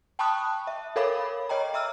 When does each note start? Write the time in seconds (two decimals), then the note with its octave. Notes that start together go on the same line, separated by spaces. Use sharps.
0.19 G5 A5 B5 C#6 D#6 F#6
0.67 E5
0.96 A4 A#4 C#5 F5 B5 D6
1.49 C#5 D#5 G5 A#5
1.74 E5 A#5 E6 F6